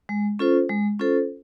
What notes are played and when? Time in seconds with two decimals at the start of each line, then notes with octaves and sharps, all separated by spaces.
0.09 G#3
0.39 C#4 F4 A4 C5
0.69 G#3
0.99 C#4 F4 A4 C5